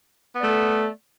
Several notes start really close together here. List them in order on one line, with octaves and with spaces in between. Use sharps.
B3 D5 A3 A4